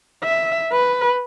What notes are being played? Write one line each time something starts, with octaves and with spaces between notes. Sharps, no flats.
E5
B4